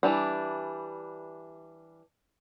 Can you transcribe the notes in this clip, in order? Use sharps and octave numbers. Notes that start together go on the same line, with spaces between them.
E3 G3 D4